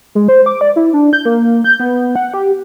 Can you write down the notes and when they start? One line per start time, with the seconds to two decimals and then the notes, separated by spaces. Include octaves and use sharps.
0.15 G#3
0.28 C5
0.46 D6
0.61 D5
0.76 E4
0.93 D4
1.13 G6
1.25 A#3
1.64 G6
1.80 B3
2.16 F#5
2.34 G4